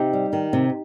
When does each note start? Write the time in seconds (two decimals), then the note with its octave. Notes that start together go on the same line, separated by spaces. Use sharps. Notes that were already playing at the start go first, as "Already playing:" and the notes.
Already playing: C3 D#4 G4
0.13 G3
0.33 D#3
0.53 C3